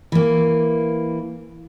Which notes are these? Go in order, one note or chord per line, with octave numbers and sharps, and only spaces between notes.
E3 A#3